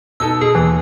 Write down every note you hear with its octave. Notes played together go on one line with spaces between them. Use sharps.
B2 D#4 A4 E6
B2 G#4
D#2 E3